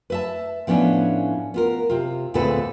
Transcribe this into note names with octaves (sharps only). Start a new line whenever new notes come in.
B4 E5 A5
A2 F3 B3 C#4 D4
B3 F4 A#4
C3 F4
D2 A#2 G#3 C4 A4 B4